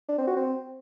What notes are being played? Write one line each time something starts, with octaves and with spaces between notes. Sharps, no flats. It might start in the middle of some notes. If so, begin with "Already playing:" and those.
D4
C4
F#4
C4